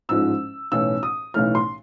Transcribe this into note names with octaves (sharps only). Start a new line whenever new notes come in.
A1 G#2 F3 G#3 E6
B1 A2 E3 A3 C#4 E6
D#6
B1 A2 E3 A3 C#4 F6
C6